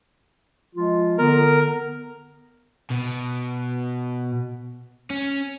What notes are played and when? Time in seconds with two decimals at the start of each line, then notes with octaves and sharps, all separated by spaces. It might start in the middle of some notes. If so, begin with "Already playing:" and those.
0.74 F3 G#3 F4
1.18 D3 B3 A#4
2.90 B2
5.10 C#4